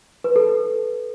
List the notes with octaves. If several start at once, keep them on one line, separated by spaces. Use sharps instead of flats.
B4
A4